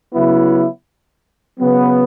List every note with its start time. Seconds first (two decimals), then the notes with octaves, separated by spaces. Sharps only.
0.13 C#3 F#3 B3 E4
1.59 C#3 F#3 B3